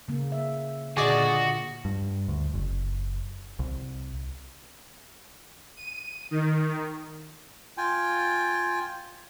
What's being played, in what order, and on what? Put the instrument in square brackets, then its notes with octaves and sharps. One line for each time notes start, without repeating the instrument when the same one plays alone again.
[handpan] C#3 A#3
E5
[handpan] A#2 D3 [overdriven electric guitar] F#4 [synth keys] G#4 D5 D#5
[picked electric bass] G2
D2
F#1
C2
[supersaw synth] D#7
D#3
[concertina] F4 G5 G#5